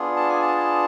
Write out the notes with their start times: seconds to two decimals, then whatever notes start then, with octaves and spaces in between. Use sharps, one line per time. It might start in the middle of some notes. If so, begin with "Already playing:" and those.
Already playing: B3 D4 F4 G#4
0.16 A5
0.29 G#5
0.42 A5